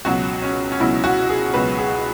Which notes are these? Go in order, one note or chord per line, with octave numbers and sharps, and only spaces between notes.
C#2 B2 F#3 F#4
C#4
C#4
C#2 B2 F#3 E4
F#4
G#4
C#2 B2 F#3 B4
G#4